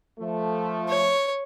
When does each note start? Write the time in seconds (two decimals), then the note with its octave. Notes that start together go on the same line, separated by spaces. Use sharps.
0.19 F3 A3
0.89 C#5